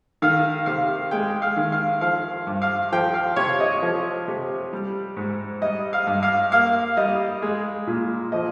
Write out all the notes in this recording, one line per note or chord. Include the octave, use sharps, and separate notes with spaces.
D#3 F5
C3 F5
G#3 G5
F5
D#3
F5
F3 F5
G2
F5
F3 G5
F5
C3 C#5
D#5
F3
C3
G3
G#2
G3 D#5
F5
G2
F5
A#3 F5
G3 D#5
G#3
A#2
F3 D#5